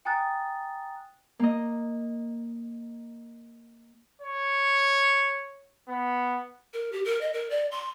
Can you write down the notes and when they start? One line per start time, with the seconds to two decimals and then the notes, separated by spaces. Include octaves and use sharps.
0.05 G5 G#5 A#5 D#6 F#6 A6
1.39 A#3 D#5
4.22 C#5
5.88 B3
6.74 A#4
6.92 G4
7.05 A#4
7.21 D#5
7.33 A#4
7.50 D5
7.71 C6